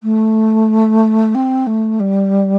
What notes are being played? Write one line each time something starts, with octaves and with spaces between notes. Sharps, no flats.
A3
C4
A3
G3